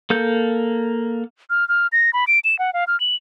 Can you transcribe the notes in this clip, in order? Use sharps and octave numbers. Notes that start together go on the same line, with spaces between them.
A#3 A4 G6
F6
F6
A#6
B5
D7
E7
F#5
F5
F6
F#7